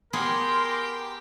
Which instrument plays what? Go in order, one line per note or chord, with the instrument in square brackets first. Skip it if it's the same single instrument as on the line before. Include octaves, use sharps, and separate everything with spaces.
[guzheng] B3 G#4 [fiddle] G4 G5 [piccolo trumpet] A#4 [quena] C6